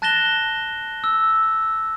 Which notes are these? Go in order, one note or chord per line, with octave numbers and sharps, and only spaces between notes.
A5 F#6 A6 A#6 E7 G7
E6